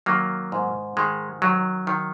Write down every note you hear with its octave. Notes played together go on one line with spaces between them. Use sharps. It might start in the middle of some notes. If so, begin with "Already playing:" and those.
D#3 F#3 A#3
G#2
D#3 G#3
D#3 F#3
D#3